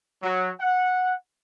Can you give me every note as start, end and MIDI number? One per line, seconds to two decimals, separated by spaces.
0.23 0.50 54
0.60 1.13 78